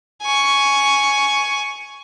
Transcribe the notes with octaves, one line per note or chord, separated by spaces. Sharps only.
G#5 C#6